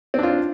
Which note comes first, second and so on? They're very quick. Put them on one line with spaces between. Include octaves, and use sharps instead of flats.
C4 D4 F4